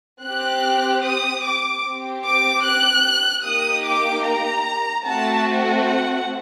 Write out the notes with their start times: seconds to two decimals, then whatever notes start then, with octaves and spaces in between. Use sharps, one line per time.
0.23 C4 G4 F#6
1.04 D#6
1.44 D6
1.84 C4 G4
2.25 D6
2.64 F#6
3.44 A#3 D#4 G4 D#6
3.85 D6
4.25 A#5
5.05 A3 C4 F#4 A5
5.85 F#5